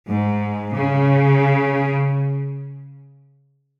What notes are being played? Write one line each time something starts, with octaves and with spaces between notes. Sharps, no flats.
G#2
C#3